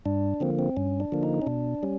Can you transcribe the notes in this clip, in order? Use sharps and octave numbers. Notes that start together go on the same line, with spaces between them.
G2 D4
D3 F3 A#3 C4
C4
G2 C#4
D4
D3 F3 A#3
D#4
C#4
B2 D4
G3 C#4